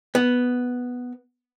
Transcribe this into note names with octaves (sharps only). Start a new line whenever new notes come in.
B3